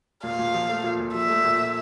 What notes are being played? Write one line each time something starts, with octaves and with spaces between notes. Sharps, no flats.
A#2 F5
A#2
F3
A3
A#2
A#2
F3 E5
A3
A#2
A#2